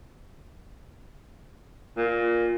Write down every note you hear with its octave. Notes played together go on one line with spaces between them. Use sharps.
A#2